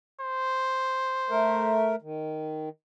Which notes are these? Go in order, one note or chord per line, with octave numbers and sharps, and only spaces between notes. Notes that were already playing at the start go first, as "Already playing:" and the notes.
C5
A3 A#4
D#3